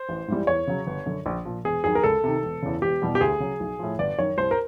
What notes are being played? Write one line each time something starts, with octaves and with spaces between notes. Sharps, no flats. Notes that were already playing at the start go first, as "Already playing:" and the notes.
Already playing: C5
A1
G#2 E3 G3
E2 C#5
C#3 F#3
G1
F#2 D3
A#1
A#2 F3
E1 G#4
D#2 D#3 F#3 G#4
A#4
C#2 A4
C3 D#3
E1
E2 C#3
E1 G4
E2 B2 G3
G4
D2 G#4
C#3 F#3
B1
A2 F3
G1 D5
F#2 D#3 C#5
C2 C5
A#4